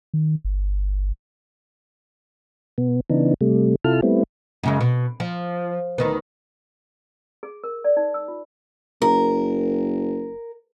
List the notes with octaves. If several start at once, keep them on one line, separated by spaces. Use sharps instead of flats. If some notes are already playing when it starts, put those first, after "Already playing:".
D#3
G1
B2 B3
C#3 E3 B3 D4 D#4
C3 G3 A3
C3 E4 F4 A4 A5 F6
G3 A3 B3 C4 E4
F#2 C#3 G#3
B2
F3
D2 D#3 B3
G#4
A#4
D5
D#4
E6
F4
F#1 A#4